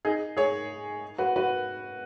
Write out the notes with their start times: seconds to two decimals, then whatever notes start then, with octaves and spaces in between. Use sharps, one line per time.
0.05 D#4 G#4
0.37 G#4 C#5
1.18 F#4 B4
1.36 F#4 B4